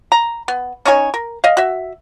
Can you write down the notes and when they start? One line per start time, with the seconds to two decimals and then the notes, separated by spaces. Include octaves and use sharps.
0.12 A#5
0.48 B3
0.85 C#4 D#4 C#5 G#5
1.14 A#4
1.44 D#5 F5
1.57 F#4 E5